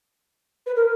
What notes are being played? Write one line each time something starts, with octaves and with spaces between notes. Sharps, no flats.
B4
A#4